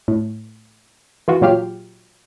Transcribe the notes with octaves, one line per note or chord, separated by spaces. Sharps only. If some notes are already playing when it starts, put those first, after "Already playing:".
A2
E3 F4 F#4
A#2 F#3 F4 G4 F5